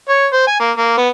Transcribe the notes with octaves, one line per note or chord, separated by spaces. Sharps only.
C#5
C5
G#5
A#3
A#3
B3